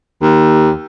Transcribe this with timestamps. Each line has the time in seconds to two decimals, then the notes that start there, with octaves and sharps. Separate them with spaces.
0.22 D#2